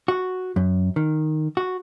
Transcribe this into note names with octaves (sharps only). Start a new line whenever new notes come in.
F#4
F#2
D#3
F#4